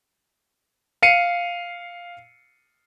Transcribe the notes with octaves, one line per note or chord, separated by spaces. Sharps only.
F5 C7 C#7 D#7